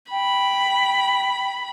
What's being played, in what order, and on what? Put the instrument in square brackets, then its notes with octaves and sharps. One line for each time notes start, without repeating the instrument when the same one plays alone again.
[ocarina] G5 [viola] B5